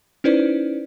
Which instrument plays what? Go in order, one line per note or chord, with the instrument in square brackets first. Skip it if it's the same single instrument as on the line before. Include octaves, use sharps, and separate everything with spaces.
[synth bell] C#4 D#4 E4 B4 C5 D5